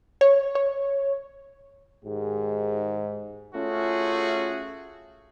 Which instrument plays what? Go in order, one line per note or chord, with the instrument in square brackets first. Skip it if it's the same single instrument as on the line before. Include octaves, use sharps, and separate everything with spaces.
[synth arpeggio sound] C#5
C#5
[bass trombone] G#2 [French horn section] D#3 G4 G#4
[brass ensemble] A3 C#4 F4 F#4 G#4